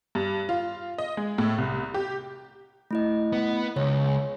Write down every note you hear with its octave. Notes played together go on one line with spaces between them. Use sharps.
G2
F4
D#5
G#3
A2
C2
G4
A3 E4 D#5
B3
C#2 C#5